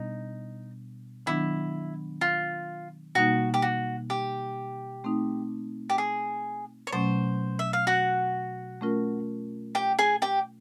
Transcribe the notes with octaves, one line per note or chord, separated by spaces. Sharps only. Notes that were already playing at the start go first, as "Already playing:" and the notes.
Already playing: B2 G3 B3 D4 D#4
D#3 F#3 B3 D4 E4
F4
B2 G3 A#3 D#4 F#4
G4
F#4
G4
A3 C4 D#4
G4
G#4
C#5
B2 F#3 A3 C#4 C5
E5
F5
F#4 F#5
A3 C#4 F4 A#4
G4 G5
G#4 G#5
G4 G5